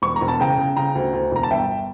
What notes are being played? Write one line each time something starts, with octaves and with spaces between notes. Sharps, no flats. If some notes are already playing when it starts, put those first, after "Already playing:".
E1 C#6
A#5
E1
A5
C#3 G5 A#5
C#3
C#3 G5 A#5
D2
D2
E1 A#5
A5
G1 E5 G5